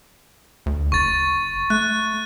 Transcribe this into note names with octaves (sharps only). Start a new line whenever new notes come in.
D2
F#1 C#6 A6
A3 F#6